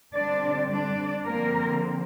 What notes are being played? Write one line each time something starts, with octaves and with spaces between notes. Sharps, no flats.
D3 G3 C4 D4 D5
D4 D5
D3 F3 A#3 C4 A#4